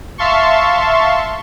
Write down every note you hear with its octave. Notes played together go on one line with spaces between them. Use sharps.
E5 F5 A5 C6 C#6